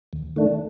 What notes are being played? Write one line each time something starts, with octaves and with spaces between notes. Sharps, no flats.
D#2
D#3 A3 D4